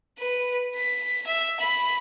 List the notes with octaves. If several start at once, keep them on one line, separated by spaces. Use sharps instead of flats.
B4
B6
E5
B5